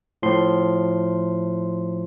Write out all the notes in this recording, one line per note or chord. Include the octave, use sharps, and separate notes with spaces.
A2 F3 C6